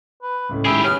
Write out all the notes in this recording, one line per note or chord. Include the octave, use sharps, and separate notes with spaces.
B4
C#2 A2 C#3
D#3 G#3 E4 G4 G#4
B3 C#4 F6